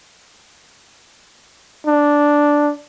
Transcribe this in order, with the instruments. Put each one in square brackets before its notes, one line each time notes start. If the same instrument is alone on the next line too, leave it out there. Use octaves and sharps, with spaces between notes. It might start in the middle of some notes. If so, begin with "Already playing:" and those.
[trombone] D4